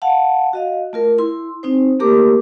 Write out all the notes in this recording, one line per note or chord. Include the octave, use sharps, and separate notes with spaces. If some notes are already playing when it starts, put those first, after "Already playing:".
F5 F#5 A5
F#4 D#5 F5
A3 F4 A#4
E4 C6
C4 D#4 C5
A3 A#3 G4 A#4 D6